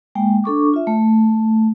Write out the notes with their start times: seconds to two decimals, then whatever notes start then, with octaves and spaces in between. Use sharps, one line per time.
0.15 G#3 A#3 G5
0.44 D4 A4 C#6 D6
0.74 F4 E5
0.87 A3